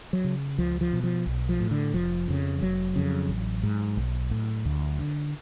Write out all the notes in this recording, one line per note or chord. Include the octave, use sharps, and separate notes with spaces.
F#3
C#3
C#2 F3
F3
B2
F3
B1
F3
A2
D3
F1 F3
F2 C#3
F1 F#3
F2 C#3
A1
G#2
B1
A2
D2
D3